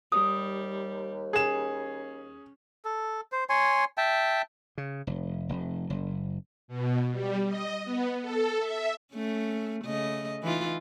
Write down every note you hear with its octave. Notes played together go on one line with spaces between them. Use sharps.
D#2 G3 D#6
C#4 G#4 E7
A4
C5
C#5 G#5 C6
E5 G5 A5
C#3
F1
F1
F#1
B2
G3
D#5
B3
A4
E5
A3 C#4
C#3 A3 D#5
E3 D#4 F4